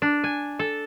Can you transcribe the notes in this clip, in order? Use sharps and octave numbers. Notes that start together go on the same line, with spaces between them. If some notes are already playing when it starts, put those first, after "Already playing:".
D4
G#5
A4